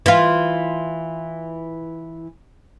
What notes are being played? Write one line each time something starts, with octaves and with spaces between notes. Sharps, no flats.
E3 F4